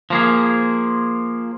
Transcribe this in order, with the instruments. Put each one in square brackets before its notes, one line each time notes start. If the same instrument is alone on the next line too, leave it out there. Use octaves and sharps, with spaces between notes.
[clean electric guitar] F3 A#3 G#4